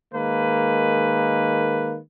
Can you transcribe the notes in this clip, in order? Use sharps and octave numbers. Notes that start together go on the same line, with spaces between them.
D#3 G#3 A#3 B4